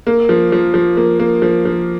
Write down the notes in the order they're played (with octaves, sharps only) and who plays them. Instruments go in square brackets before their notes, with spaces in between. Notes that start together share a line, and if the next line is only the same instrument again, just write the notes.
[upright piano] A#3
F3
F3
F3
A#3
A#3
F3
F3